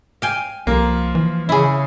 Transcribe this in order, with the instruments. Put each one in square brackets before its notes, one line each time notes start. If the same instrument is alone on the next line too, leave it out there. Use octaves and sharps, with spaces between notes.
[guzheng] F5 G5 G#5
[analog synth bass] C2 [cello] F3 [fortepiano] A#3
[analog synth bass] E3
[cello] C#3 [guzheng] E4 G#4